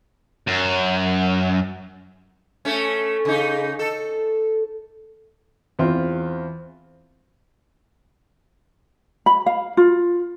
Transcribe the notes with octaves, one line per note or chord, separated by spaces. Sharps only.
F#2
A3 C#4
C#3 D#4
A4
E2 C4 F4
B5
F5
F4